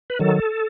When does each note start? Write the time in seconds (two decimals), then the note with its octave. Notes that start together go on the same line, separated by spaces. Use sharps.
0.10 B4
0.19 D#3 F#3 A4